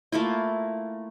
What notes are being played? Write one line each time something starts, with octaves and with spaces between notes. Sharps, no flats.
A3 A#3 E4 F4